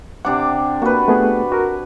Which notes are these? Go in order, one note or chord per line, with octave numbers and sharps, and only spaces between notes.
C3 D4 F#5 D6
A#3 F#4 B4
A3 B3 G#4
F#4 A#4